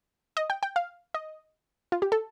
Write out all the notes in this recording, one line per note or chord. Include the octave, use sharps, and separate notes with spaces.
D#5
G5
G5
F5
D#5
F4
G4
A4